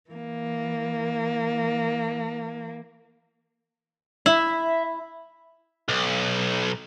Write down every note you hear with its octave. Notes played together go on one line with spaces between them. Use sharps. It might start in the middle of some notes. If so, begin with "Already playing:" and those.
E3 A#3
E4 E5
B1